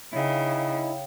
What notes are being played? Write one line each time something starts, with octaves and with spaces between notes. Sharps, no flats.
C#3 D#4 E4 C#5 F5 G5